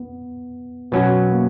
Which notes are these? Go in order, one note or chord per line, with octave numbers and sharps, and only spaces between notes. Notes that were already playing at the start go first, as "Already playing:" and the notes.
Already playing: B3
B2 F#3 B3 C#4 F#4
A#3